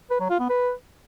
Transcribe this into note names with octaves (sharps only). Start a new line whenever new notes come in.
B4
F#3
F4
B3
B4